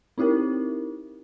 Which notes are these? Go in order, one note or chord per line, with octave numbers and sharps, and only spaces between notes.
C4 D#4 E4 G4 A#4